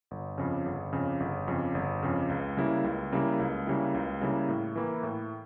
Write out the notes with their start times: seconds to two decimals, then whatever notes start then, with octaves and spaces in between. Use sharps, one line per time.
0.11 G1
0.38 F2 C#3
0.66 G1
0.93 F2 C#3
1.20 G1
1.48 F2 C#3
1.75 G1
2.03 F2 C#3
2.29 C#2
2.57 C#3 G3 A#3 E4
2.84 C#2
3.12 C#3 G3 A#3 E4
3.40 C#2
3.67 C#3 G3 A#3 E4
3.94 C#2
4.21 C#3 G3 A#3 E4
4.49 A2
4.76 E3 A#3 E4
5.03 A2